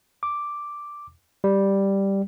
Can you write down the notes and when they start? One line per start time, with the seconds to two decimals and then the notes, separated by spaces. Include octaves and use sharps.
0.23 D6
1.44 G3